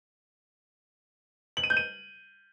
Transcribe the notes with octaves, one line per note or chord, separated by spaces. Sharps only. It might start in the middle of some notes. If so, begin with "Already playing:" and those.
F#7
D#7
G6
D#7